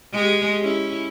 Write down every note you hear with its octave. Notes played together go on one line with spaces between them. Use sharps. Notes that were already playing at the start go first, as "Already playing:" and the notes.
G#3 G4 G#4
C#4 E4